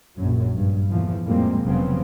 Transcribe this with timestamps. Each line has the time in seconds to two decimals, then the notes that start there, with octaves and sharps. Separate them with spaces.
0.15 A#1 F#2 F#3
0.54 G2
0.90 E2 A#2 E3 F3
1.23 F2 A2 G3 G#3 A#3 C4
1.63 F1 C#3 F3 F#3 B3 C4